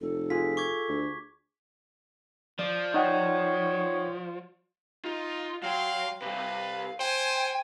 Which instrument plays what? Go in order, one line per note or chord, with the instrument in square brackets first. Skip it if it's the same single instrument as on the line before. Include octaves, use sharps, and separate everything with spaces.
[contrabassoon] F1 [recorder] A4
[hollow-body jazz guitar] F4 G#4 [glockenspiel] B6
[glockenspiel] C#6 D6 G#6
[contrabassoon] D2
[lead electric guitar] F3 [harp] D5
[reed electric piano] D#4 F#5 G5 [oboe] C#5
[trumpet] D#4 [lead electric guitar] F4
[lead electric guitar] F#3 [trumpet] F5 [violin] G5 C6
[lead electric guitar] C3 G3 [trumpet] B4 [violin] F5
[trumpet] C5 [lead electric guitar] G5 [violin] G#5